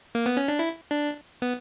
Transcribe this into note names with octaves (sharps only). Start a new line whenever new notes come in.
A#3
B3
C#4
D4
E4
D4
B3